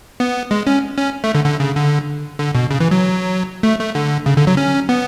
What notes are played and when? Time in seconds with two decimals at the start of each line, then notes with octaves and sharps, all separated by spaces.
0.20 B3
0.51 G#3
0.67 C#4
0.98 C#4
1.24 A3
1.35 D3
1.45 D3
1.60 C#3
1.76 D3
2.39 D3
2.55 B2
2.70 C#3
2.80 E3
2.91 F#3
3.63 A3
3.79 A3
3.95 D3
4.26 C#3
4.37 D3
4.47 F#3
4.57 C#4
4.89 B3